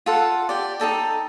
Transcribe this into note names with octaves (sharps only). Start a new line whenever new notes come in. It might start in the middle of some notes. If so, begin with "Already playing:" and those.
F4 A4 F#5
G4 D5
D#4 F4 A4 G5